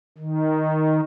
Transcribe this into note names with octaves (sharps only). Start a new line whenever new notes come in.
D#3